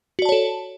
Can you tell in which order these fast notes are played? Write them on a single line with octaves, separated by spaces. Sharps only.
F#4 D5 A5 C#5 A4